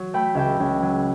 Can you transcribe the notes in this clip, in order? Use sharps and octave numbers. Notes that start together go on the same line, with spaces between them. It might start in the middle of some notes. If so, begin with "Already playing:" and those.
Already playing: F#3
A3 G5 B5
C#2 E5 G5
C#2
F#3